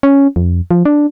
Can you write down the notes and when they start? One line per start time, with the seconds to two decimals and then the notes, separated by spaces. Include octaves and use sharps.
0.03 C#4
0.36 F2
0.71 F3
0.85 D4